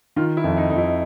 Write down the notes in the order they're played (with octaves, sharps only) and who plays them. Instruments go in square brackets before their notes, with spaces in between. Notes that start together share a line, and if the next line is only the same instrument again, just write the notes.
[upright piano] D#3 [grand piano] F4
[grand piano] E4
[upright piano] F2
[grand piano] D#4
[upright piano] F2 [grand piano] D#4
[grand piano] E4